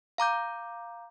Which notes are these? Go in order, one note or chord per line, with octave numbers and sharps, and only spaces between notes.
F5 A#5 D6 G6